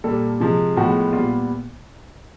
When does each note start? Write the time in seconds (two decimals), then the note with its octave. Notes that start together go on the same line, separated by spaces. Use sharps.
0.04 A#2 G3 A#3 A4
0.40 C3 F3 G#3
0.76 A2 F3 G#3 B3 F#4
1.13 A#2 G3 B3 F4